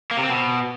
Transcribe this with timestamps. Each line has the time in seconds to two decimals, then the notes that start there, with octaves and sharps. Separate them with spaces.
0.11 A#3
0.17 C3
0.23 C4
0.30 B2